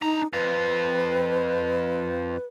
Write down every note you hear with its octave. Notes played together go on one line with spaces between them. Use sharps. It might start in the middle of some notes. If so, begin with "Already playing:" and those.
D4 D#4 A#5
F2 F4 B4